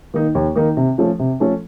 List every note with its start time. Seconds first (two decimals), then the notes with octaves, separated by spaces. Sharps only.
0.14 D#3 A#3 D#4
0.35 D#2
0.56 D#3 A#3 D#4
0.77 C3
0.98 F3 A3 C#4 A4
1.19 C3
1.40 F3 A3 C#4 A4